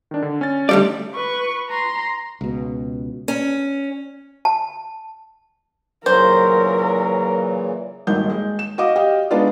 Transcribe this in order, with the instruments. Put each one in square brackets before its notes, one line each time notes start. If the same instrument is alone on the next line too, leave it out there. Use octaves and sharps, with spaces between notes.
[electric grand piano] D#3 D4
D3
C#4 A6
[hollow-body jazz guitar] D2 G3 D5 [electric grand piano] A3
[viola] B4 C#6
A#5 C6
[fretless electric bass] C#2 B2
[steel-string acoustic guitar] C#4
[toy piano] A5
[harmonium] A#2 C#3 E3 [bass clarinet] F#3 [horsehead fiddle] A#4 [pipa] C5
[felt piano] D#1 G#1 D#3 G6
G#3
E7
F#4 D#5 F5 D6
G4 D#5 F5 G5
G#3 B3 D4 D#4 F4